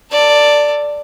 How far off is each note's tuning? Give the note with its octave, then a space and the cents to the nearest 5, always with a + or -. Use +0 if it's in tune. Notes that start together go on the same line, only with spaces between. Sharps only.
A4 +25 D5 +0